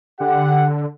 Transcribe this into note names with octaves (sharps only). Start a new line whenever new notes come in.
D3 G4 F#5